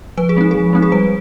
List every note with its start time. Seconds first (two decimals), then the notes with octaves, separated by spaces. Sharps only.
0.17 F3 B4
0.29 G#4
0.37 G#3 C4 D#4
0.51 F3 G#4
0.73 G#3 C4 D#4
0.82 G#4
0.92 G3 B4